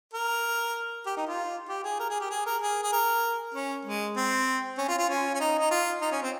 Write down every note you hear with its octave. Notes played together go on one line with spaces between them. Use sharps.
A#4
G4
D#4
F4
G4
G#4
A#4
G#4
G4
G#4
A#4
G#4
G#4
A#4
C#4
G#3
C4
C#4
F4
F4
C#4
C#4
D#4
D#4
F4
D#4
C#4
C4